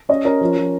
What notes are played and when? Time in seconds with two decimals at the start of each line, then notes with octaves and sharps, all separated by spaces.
0.09 C#4 D#5
0.25 C#4 A#4
0.41 F3
0.57 F3